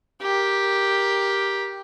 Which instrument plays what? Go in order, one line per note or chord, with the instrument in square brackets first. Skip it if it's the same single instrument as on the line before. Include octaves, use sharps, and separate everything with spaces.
[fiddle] G4 A#4